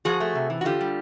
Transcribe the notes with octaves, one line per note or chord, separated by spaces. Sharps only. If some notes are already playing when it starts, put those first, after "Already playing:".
F3 F#4 G#4
A3
C3
E3
F#4
D3 F4 G4
G3